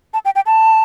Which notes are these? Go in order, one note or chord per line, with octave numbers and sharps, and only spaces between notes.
A5
G5
G5
A5